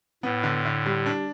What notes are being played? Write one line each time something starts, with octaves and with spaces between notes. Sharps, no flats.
A2 B3
D3
D3
G3
D4